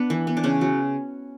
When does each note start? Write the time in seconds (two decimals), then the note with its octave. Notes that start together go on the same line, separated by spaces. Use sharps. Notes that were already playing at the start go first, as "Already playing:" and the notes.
Already playing: B3 D4
0.10 E3
0.27 B3
0.37 D4
0.44 C#3 C#4
0.61 F#3